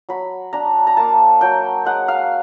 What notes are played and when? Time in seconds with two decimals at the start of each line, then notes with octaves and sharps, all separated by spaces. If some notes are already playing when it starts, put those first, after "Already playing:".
0.09 F#3 B5
0.53 D4 A#5
0.87 A#5
0.97 A#3 A5
1.41 F#3 G5
1.85 G#3 F#5
2.08 F5